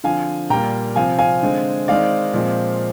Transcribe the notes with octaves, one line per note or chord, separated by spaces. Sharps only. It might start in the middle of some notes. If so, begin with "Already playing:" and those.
D3 F3 C4 F5 G#5
A#2 G3 A#3 G5 A#5
C3 F3 C4 F5 G#5
F5 G#5
D3 G#3 C4
D#3 G#3 C4 D5 F5
A#2 F3 G#3 C4